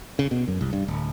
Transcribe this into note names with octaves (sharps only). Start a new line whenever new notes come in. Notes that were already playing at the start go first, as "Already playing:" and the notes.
C#3
B2
F#2
C2
G2
D1